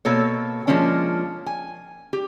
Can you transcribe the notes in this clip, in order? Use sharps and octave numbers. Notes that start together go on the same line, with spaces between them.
B2 A#3 A4 C#5
F3 G#3 A#3 C#4 D4
G#5
G4